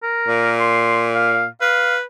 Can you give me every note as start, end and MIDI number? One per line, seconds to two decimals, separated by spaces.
0.03 0.54 70
0.28 1.47 46
0.60 1.06 84
1.15 1.46 77
1.61 2.02 71
1.61 1.96 77